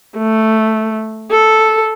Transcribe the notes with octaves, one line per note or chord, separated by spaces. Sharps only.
A3
A4